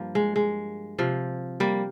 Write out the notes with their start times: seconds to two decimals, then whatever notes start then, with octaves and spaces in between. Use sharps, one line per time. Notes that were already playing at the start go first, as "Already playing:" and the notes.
Already playing: G2 F3 A#3
0.15 G#3
0.36 G#3
0.98 C3 F3
1.60 G3 A#3